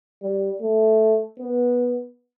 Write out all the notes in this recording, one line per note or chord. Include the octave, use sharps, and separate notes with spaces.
G3
A3
B3